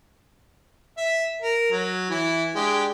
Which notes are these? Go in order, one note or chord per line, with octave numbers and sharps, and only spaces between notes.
E5
A#4
F#3
E3 E4
G#3 D4 G4